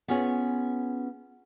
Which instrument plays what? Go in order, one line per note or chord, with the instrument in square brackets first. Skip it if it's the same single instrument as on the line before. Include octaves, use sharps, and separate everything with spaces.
[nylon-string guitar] B3 C#4 F4 G#4 C#5